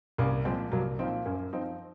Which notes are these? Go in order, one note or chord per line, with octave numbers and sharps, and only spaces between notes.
C2 A#3 C#4
A#2 F3 G#3 C4
C2 F#3 A#3
A#2 F3 C4 D#4
F#2 A#3 C#4
F3 C4 D#4